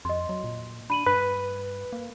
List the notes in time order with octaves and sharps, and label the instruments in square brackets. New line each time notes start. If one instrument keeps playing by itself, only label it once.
[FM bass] F2 [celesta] D#5 C6
[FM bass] F#3
A#2
[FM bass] D4 [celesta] B5 D#7 F#7
[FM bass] G2 [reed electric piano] B4
[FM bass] A#3